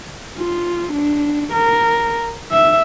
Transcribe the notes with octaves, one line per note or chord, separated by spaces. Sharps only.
F4
D4
A#4
E5